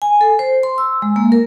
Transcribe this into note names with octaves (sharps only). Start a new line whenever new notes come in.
G#5
A4
C5
C6
E6
G#3
A#3
A#4